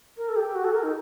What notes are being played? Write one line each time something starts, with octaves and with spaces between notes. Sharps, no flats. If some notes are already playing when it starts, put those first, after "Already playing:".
A#4
A4
G4
F#4
A4
A#4
D#4